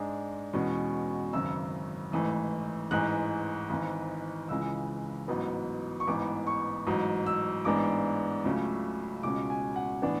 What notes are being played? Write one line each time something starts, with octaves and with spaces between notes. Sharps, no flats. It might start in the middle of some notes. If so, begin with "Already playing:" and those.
Already playing: G#2 G#3 D4
E2 B2 G#3 C#4
G#1 F#2 C#3 E6
A1 G#2 E3 A3
A1 G#2 E3 G#3 F#6
G#1 G#2 E3
C#2 C#3 E3 G#3 E6
A1 G#2 F#3 B3
C#6
A1 G#2 E3 B3 D6
C#6
A1 G#2 F#3
E6
A1 G#2 G#3 B3 D4 D6
C#2 C#3 F#3 A3 C#4
C#2 B2 G#3 C#4 D6
G#5
F#5
A2 E3 B3 D4 F#5